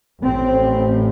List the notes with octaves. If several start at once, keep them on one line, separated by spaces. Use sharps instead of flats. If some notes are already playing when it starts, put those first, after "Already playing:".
A1 A2 C4